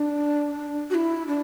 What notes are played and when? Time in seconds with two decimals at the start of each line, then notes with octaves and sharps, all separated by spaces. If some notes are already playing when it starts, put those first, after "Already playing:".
Already playing: D4
0.90 F#4
0.94 E4
1.27 D4